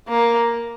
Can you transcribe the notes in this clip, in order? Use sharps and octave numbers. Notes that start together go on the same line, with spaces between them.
A#3